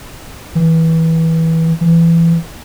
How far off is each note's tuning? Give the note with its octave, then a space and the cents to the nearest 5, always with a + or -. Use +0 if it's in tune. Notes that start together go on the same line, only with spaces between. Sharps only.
E3 -20
E3 +20